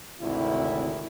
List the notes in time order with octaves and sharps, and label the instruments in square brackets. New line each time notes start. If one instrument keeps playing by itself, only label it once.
[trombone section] G#1 D2 C3 E4